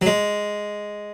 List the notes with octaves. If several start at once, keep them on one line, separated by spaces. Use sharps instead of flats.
F#3
G#3